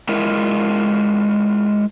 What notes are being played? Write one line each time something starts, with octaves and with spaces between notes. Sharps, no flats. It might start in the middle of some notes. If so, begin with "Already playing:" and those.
G#3 E4 F4 A#4